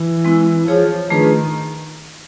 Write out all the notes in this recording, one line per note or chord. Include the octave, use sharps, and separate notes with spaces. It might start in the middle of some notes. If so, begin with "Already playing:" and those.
Already playing: E3
G#3 C4 E4
F3 F4 G#4 C#5
D#3 A3 D4 F4 G#4 B4